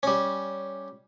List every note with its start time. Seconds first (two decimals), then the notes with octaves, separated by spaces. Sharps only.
0.03 G3 C#4